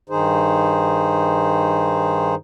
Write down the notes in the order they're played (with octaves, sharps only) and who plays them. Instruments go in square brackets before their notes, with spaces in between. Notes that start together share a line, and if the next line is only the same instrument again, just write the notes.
[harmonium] G2 D#3 D#4 G#4 C5